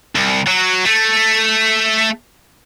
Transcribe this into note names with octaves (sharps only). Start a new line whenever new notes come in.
C2
F#3
A3